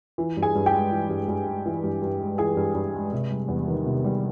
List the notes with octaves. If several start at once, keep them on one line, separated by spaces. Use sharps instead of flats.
E3
G2
G#4 G#5
G2
G4 G5
G#3
E3
G2
G2
G#3
E3
G2
G2
G#3
E3 G#4 G#5
G2
G2
G#3
C3
G3
E2
D#3
C3
G3